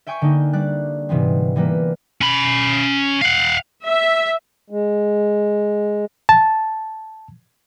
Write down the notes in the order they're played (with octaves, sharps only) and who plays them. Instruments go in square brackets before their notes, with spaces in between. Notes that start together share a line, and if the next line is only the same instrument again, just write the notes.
[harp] E5 G5 G#5 C#6 G6 D7
D3 A#3 D#4
G3 D5 F#6
G#2 C3 E3 B3 C4
E3 G3 A#3 B4
[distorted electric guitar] C#4 B5
F5 F#5
[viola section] E5
[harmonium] G#3
[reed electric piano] A5